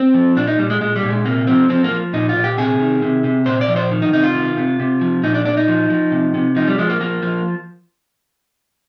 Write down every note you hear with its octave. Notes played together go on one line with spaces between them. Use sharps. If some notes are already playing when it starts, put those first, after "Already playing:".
Already playing: C4
F3
A#2 D4
D#4
A#2 G3
G#3
A#2 G#3
G3
A#2
G#3
C3 A#3
F3 C4
F3 C4
A#3
F3
A#2 D#4
F4
A#2
G4
C3 G#4
D#3
C3
C3
A#2 C5
D5
F3
C5
D#3
D#4
C3 D#4
F4
D#3
C3
C3
F3
A#2 D#4
D4
A#2 D4
D#4
F3
F3
C3
C3
F3 D#4
G3
F3 G#3
A#3
F3 A#3
F3